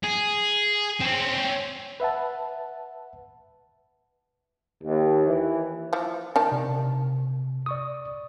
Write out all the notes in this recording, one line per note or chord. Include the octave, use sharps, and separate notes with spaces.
G#4
C4 C#4
B4 E5 F#5 A5
D#2
E3
E3 F3
D#3 D4 A5
C3
D5 C#6 D#6